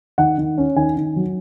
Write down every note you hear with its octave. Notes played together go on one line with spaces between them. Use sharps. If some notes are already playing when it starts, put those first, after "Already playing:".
D#3 F#5
D#3
C#4
D#3 G#5
D#3
F#3